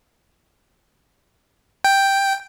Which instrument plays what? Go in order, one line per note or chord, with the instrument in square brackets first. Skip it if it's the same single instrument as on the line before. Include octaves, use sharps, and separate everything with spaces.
[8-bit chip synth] G5